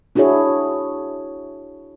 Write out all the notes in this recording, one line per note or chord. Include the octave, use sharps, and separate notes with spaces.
D4 E4 F#4 G#4 C#5